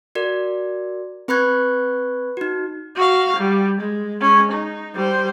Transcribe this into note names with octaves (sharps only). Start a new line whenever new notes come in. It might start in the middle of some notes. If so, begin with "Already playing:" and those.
F#4 A#4 D5
C4 B4 B5 C#6 F#6 G#6
D#4 F#4
F#4 F5
G3
G#3
G#3 C#4
D#4
G3 C5